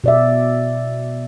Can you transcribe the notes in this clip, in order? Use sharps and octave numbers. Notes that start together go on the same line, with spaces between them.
B2 D5 E5